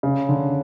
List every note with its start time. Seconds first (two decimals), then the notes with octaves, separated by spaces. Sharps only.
0.03 C#3
0.29 D3